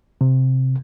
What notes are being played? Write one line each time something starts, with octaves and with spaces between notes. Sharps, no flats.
C3